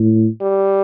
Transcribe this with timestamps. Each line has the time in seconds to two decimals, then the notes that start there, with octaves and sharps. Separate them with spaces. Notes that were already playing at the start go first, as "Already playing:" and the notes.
Already playing: A2
0.41 G3